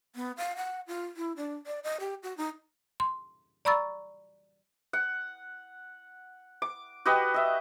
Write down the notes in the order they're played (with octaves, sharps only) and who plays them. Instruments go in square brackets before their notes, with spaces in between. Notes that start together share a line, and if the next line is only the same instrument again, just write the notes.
[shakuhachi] B3
F5
F#5
F4
E4
D4
D5
D#5
G4
F#4
D#4
[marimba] C6
D5 A#5 B5 C#6 E6 A6
[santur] F#5
D6
F#4 G4 B4 D#5
D#5 E5